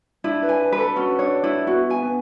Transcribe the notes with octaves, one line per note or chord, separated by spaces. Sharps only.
D4 E4
B4
G#5
B4
B4
A4
C#4 F#4
D4 C#5
D4 E4
B3 F#4
G#5
B3